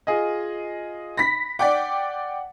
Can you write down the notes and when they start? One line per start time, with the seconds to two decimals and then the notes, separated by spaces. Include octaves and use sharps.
0.07 F4 G#4 D#5
1.17 B5 A#6 B6
1.59 D5 F#5 G5 D6